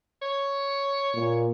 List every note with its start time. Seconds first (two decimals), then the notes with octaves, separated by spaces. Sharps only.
0.22 C#5
1.14 A#2